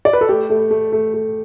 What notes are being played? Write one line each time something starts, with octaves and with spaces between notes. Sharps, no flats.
D5
B4
A4
A3 G4
A3
A3
A3
A3